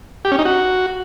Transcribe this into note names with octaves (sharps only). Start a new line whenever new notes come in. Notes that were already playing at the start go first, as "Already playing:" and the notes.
G4
C#4
D#4
F#4